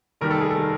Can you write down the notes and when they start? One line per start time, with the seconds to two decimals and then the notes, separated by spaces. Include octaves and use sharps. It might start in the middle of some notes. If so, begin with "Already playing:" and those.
0.21 F1 D#2 D#3 G3 A#4
0.31 A4
0.41 G#4
0.51 A4
0.57 D#3 G3